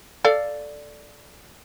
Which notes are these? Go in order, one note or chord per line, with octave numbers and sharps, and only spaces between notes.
A4 D5 F5